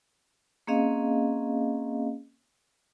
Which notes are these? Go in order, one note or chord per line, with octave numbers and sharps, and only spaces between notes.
A#3 C4 C#4 G#4 D#5 F5